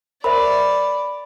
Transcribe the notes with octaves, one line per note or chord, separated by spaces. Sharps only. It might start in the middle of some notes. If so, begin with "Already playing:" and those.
A#4 C5 D5 E5 B5